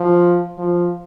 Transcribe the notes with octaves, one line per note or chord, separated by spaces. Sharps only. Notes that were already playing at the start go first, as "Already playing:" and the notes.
Already playing: F3
F3